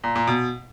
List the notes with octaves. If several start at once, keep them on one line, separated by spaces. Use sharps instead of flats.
A#2
A#2
B2